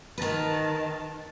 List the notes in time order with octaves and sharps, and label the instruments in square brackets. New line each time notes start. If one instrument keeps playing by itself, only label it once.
[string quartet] D#3 A5 [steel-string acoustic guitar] A#4 B4